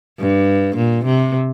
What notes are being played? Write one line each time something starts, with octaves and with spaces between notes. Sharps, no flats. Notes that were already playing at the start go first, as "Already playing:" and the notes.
G2
A#2
C3